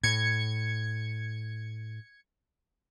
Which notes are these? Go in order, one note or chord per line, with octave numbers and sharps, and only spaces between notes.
A2 G#6 C#7